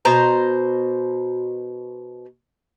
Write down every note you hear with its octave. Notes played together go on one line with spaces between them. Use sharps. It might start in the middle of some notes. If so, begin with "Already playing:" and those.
B2 C5 A#5